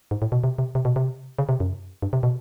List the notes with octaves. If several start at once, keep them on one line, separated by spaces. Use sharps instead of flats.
G#2
A2
B2
C3
C3
C3
B2
C3
C#3
C3
F#2
G2
C3
B2